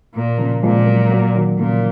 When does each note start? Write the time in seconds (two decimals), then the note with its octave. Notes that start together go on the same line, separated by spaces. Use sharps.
0.14 A#2
0.38 C#3 F3
0.63 A#2 F3 G#3
0.87 F#3 A#3
1.11 F#3 A#3
1.35 D#3 F#3
1.59 A#2 C#3 F3